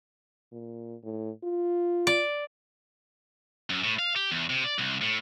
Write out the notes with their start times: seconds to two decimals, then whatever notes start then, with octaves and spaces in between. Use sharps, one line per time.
0.52 A#2
1.03 A2
1.44 F4
2.07 D5
3.70 F#2
3.84 A2
3.99 F5
4.16 G4
4.31 E2
4.50 C3
4.64 D5
4.79 C2
5.01 A2